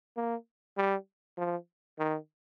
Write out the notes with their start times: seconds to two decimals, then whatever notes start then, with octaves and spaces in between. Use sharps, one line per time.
0.17 A#3
0.77 G3
1.38 F3
1.99 D#3